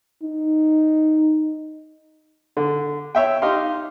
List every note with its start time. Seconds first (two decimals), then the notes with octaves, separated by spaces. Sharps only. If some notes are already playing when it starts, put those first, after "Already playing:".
0.23 D#4
2.57 D3
3.15 C#5 E5 G5
3.42 D#4 G4 F5 C6